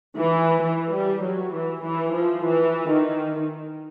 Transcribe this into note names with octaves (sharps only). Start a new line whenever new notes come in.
E3
E3
G3
F#3
E3
E3
F3
E3
D#3